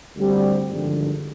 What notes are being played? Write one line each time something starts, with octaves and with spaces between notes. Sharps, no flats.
D2 D3 G3 C4 G4
G#1 G2 D3 F3